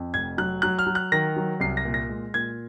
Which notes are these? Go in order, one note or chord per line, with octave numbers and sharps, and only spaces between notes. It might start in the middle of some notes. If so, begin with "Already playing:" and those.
Already playing: F2
F1 G#6
F#3 F#6
F#3 F#6
F6
F#3
F#6
D#3 A#6
F#3
C2 C7
A#6
A#2
A#6
G#3
A#2 G#6